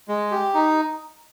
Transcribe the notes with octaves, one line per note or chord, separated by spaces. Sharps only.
G#3
G4
D#4